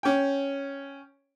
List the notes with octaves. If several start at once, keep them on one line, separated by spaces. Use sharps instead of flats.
C#4 G5